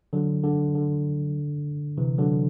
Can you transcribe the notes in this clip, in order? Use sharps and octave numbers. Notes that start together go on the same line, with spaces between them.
D3 F#3
D3
D3
C3 E3
D3 F#3